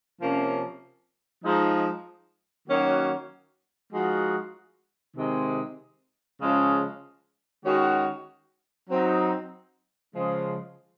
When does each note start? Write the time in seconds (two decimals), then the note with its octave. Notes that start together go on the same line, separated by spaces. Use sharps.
0.20 C3 F3 A#3 C#4
1.44 F3 G#3 D#4
2.68 D#3 F#3 A#3 C#4 F#4
3.92 F3 G#3 D#4 F#4
5.16 C3 D#3 G#3
6.40 C#3 F3 G#3 C#4
7.65 D#3 G#3 C#4 F#4
8.89 F#3 C4 D#4
10.13 C#3 F3 G#3